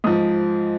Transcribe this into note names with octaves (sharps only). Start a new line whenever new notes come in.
G#2 F3 D#6